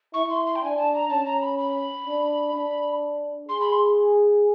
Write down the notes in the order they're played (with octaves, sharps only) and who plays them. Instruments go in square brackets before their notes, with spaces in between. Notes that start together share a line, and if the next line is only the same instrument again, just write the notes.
[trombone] E4 [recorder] C#6
[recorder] C6
C6
G5
[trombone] D4 [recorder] G#5
[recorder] A5
A#5
[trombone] C#4 [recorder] A5
[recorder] A#5
B5
B5
[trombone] D4
D4
[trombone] G#4 [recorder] C6
[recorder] B5
C6